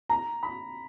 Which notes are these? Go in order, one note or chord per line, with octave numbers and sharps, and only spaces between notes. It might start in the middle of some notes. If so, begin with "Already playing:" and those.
A#5
B5